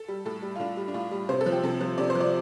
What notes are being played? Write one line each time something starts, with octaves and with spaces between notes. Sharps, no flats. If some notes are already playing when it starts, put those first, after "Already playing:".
Already playing: A4
G3
A2 A4
G3
F4
A2 D4
G3
D4
A2 F4
G3
C3 C5
A4
F3
G4
C3 A4
F3
C3 D5
C5
F3
D5